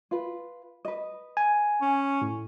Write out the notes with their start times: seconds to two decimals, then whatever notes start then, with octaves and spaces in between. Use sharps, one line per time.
0.11 F4 B4
0.85 B4 D#5
1.37 G#5
1.81 C#4
2.22 A2